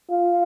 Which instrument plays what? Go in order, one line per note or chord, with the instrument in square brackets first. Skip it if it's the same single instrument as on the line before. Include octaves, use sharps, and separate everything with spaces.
[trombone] F4